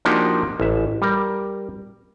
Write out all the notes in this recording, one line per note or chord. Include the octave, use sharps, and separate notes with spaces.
F3 A#3 D4 D#4 F#4 G4
A1 E5
G3 A#4